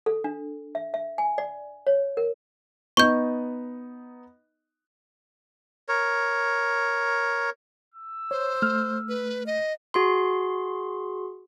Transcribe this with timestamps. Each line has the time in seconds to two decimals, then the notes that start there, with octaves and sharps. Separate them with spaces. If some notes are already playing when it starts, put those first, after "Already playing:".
0.06 A4
0.24 D4
0.75 E5
0.94 E5
1.18 G#5
1.38 D5
1.87 C#5
2.17 A#4
2.97 B3 D#4 D#5 C#6 G6
5.88 A#4 C#5
7.94 E6
8.31 C5 C#5
8.62 A3 F6
9.09 B4
9.46 D#5
9.94 F#4 G#4 C6